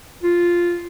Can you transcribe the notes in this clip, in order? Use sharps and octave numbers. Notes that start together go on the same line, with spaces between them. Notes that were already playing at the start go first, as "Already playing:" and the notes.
F4